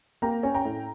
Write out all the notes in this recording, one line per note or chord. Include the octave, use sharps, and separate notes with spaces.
A#3 G5 A#5
C#4
G5 A#5
A2